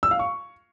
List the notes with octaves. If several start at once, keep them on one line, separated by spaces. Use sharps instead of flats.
E6
F5
C#6